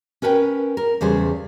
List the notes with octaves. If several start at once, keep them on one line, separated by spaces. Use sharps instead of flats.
C#4 A#4 B4 F#5 G5
A#4
E2 C#3 G3 G#4 C5